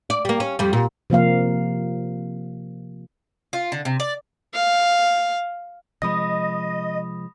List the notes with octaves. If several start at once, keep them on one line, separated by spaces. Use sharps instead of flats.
D5
G3 A#3
C#4
F2 G3
A#2
C3 F3 A#3 F5
F4
D3
C3
D5
F5
C3 F3 G#3 D#5 B5 D#6 A#6